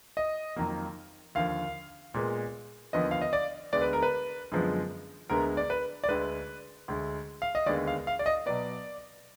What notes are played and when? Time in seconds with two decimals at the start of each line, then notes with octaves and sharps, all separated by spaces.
0.17 D#5
0.56 F2 D#3 F#3 A#3
1.35 D#2 D3 F3 F5
2.14 A#2 G#3 B3
2.93 D#2 D3 F3 B3 D#5
3.11 F5
3.22 D#5
3.33 D5
3.72 D2 D3 G#3 B3 D5
3.82 B4
3.93 A#4
4.03 B4
4.52 F#2 D3 F3 G#3 B3
5.30 D2 D3 G#3 B3 A#4
5.57 D5
5.70 B4
6.04 D5
6.09 D2 D3 G#3 B4
6.88 D2 D3 G#3
7.42 F5
7.55 D#5
7.66 D#2 D3 G#3 B3 D5
7.87 F5
8.07 F5
8.19 D5
8.26 D#5
8.46 B2 F#3 B3 D5